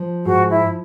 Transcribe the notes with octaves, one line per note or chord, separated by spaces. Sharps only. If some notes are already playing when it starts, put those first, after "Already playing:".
Already playing: F3
G#2 F#4
E4